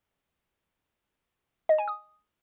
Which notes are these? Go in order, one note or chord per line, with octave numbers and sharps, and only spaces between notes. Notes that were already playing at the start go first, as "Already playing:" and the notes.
D#5
G#5
D#6